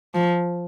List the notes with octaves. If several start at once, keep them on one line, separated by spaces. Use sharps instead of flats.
F3